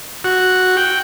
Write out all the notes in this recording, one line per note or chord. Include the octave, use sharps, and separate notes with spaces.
F#4
G5